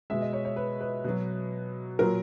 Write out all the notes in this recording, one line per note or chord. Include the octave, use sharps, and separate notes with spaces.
B2 G#3 E5
D#5
C#5
C#5
B4
B4
B2 F#3
A#2 F#3 A#4